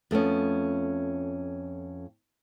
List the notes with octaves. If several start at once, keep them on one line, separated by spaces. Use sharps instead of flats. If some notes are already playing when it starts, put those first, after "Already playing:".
F2 A3 B3 C#4